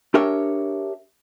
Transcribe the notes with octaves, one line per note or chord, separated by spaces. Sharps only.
D4 G4 A#4 C#5 E5